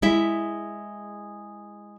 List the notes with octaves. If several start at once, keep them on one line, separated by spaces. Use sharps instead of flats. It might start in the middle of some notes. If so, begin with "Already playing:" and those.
G#3 E4 E5